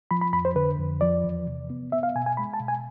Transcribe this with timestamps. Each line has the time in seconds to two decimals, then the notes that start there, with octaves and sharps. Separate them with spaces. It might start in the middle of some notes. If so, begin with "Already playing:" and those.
0.11 F3 B5
0.21 B5
0.33 F2 B5
0.45 C5
0.55 D3 B4
0.79 F2
1.01 F3 D5
1.24 E2
1.47 C3
1.70 B3
1.92 B3 E5
2.03 F5
2.15 B2 G#5
2.26 G#5
2.37 G#3 B5
2.54 A5
2.60 B2
2.68 G#5